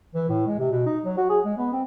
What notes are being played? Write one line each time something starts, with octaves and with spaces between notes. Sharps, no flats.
E3
A2
G#3
C3
B2
D#4
F#3
F#4
G#4
G#3
B3
C4